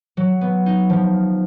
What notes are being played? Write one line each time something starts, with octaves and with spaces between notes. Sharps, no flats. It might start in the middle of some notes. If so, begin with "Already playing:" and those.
F#3
B3
D#4
F3